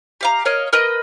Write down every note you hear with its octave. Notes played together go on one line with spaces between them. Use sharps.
G4 F5 A#5
A#4 C#5 D#5 F5
A#4 B4 D#5